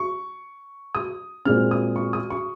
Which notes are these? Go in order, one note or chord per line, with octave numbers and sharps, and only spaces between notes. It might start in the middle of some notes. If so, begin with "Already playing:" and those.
Already playing: C#6
D#6
A#2 G#3 C4 F6
D#6
C#6
D#6
C#6